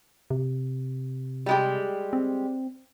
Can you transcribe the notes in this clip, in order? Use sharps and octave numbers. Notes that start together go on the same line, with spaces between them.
C3
G3 G#3 G4
C4